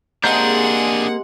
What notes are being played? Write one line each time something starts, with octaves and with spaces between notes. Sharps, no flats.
C3 G#3 A#3 D4 G#4 F#5 A#5 G6